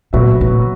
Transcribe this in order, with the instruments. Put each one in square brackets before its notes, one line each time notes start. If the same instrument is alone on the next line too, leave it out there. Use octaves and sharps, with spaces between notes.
[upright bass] A#2 [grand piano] F#3 B3 F#4 B4 E5
[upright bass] A#2